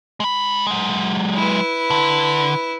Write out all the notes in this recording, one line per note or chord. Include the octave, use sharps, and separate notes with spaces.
G#3 B5
F#3 G#3
E4 B4
D3